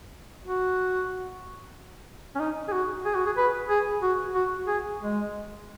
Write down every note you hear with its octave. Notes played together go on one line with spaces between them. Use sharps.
F#4
C#4
D#4
G#4
F#4
G#4
F#4
G#4
B4
G#4
F#4
F#4
G#4
G#3